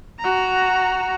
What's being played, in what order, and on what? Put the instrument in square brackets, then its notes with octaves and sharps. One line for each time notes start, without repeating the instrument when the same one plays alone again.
[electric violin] F#4 A#5